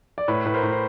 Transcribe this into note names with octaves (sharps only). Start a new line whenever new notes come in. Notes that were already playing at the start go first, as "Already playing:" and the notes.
D5
A2 B4 C#5
A2 B4
A#4 C5
A2
C5